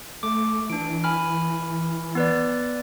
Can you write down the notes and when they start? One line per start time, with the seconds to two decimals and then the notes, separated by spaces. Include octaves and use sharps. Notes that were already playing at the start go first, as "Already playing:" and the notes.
0.23 A3 D6
0.70 E3 D4 D7
1.04 G#5 B5 F6
2.15 B3 B4 D5